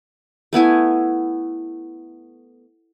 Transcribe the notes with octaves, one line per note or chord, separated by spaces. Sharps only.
A3 B3 E4 G#5